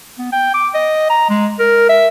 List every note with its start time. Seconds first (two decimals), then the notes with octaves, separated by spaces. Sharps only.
0.18 B3
0.32 G5
0.54 D6
0.74 D#5
1.10 A#5
1.30 G#3
1.59 A#4
1.89 E5